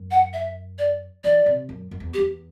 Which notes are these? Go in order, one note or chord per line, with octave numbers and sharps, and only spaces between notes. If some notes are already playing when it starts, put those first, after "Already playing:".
Already playing: F#2
F#5
E5
D5
E3 D5
C3
F#2
F#2
E2
G4
E2